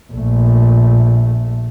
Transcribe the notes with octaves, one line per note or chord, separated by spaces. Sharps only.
A#1 A3